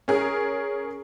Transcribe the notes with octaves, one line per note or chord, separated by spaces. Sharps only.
C#4 G#4 A#4